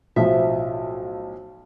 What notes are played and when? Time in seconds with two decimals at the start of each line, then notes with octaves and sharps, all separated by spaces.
0.16 B1 A2 F3 E5